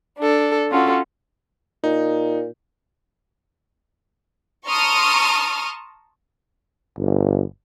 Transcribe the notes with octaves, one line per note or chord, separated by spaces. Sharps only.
D4 A4
C#4 F4 F#4 A4
A#2 D#4
A5 A#5 C6 C#6 D#6 F6
G1